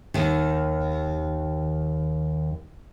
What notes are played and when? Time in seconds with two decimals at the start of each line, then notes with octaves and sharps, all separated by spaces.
0.14 D#2 D#3